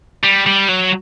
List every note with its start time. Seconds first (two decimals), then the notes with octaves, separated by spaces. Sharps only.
0.24 G3
0.47 G3
0.69 F#3